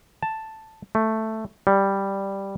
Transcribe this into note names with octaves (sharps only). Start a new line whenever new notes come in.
A5
A3
G3